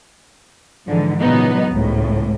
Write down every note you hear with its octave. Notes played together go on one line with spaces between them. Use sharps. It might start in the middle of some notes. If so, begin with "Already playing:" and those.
G#2 D3 E3 F3
A#2 C#3 E3 F#3 B3 D#4
G#1 C#2 A2